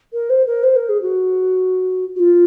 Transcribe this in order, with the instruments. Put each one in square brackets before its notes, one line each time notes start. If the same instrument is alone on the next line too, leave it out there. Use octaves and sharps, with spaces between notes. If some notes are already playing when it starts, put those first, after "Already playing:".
[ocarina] A#4
C5
A#4
C5
A#4
G#4
F#4
F#4
F4